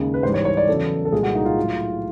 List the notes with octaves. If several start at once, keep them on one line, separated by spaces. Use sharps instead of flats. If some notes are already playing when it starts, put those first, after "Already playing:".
Already playing: D#2 C#3 G#3
B4
G#2 E3 G3 C5
C#5
C#5
D5
E2 C#3 F#3 A4
A4
C2 A#2 F3 G#3 G#4
F#4
D#4
F4
A2 F#3